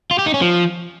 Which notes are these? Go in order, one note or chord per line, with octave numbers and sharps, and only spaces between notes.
F4
G4
D#4
C#4
F3